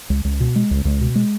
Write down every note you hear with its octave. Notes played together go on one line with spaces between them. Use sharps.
C#2
C#2
B2
G#3
C#2
C#2
B2
G#3